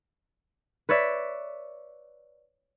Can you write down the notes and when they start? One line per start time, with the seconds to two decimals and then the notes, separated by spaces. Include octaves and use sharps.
0.89 B4 C#5 D5 E5